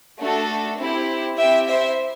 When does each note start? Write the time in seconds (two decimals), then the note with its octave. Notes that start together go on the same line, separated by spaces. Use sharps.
0.19 A3 D4 F#4 A4
0.79 C4 E4 G4
1.38 C4 E4 G4 E5 G5
1.68 C5 E5